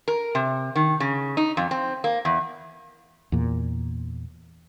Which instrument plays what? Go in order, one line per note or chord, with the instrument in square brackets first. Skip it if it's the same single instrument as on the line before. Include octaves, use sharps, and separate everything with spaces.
[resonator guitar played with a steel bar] A#4
C3
D#3
C#3
D#4
F2
C4
A#3
E2
[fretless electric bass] E2 A#2